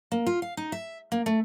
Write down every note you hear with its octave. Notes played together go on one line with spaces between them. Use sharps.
A#3
F4
F5
D#4
E5
A#3
A3